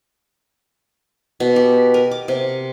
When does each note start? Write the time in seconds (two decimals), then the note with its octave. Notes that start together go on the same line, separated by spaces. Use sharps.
1.40 B2
1.56 G4
1.94 A#4
2.11 D6
2.28 C3